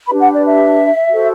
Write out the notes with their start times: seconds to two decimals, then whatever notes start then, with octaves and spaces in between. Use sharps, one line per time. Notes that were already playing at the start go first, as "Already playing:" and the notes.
0.07 D4 G4 B4 B5
0.20 F#5
0.34 D5
0.46 E5
1.11 F#4 A4 C5